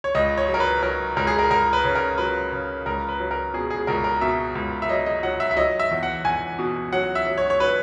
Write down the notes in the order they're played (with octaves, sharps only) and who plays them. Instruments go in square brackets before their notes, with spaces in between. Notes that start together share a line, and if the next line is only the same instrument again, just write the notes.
[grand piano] C#5
C#2 D#5
C#5
F#3
A#4
B4
F#3 A#4
C#2 A#4
G#4
A#4
C#2 A#4
B4
C#3
A#4
F#3 B4
C#3
C#2 A#4
B4
F#3
A#4
B2 G#4
G#4
C#2 A#4
A#4
B2 E5
C#2
E5
F#3 D#5
D#5
F#3 F#5
E5
E5
F#3 D#5
E5
E2
F#5
E2 G#5
B2
F#3 F#5
E5
F#3
C#5
C#5
F#3 B4